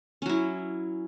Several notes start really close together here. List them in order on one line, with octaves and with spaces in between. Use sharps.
C#4 F#3 E4